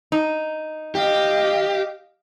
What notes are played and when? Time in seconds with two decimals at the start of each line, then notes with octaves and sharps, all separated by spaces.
0.12 D#4
0.95 G4 D#5 F5